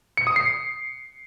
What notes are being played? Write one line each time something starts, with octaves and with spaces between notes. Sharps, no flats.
C#7
D#6
C7